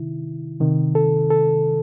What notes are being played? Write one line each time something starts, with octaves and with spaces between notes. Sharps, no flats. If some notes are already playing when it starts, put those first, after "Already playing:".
Already playing: C3 D#3 E4
C3 D#3
A4
A4